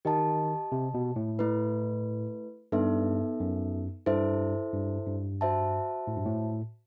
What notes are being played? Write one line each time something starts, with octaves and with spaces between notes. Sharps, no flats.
D#3 G4 D#5 A5
C3
B2
A2
A3 E4 B4
G2 B3 D#4 A4 E5
F#2
G2 E4 A4 C5 E5
G2
G2
F#4 C5 E5 A5
A2
G2
A2